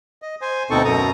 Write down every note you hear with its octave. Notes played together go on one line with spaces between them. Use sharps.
D#5
C5 G#5
D2 B2 C4 D#4 A4 C#6
F#2 B2 A#5 D#6